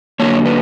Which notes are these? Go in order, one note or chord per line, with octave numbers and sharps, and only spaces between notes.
D3 F#3 A#3 C#5
B4